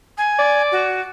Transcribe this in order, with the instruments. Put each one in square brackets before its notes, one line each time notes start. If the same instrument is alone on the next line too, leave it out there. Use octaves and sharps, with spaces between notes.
[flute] G#5
[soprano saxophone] D5
[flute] F#4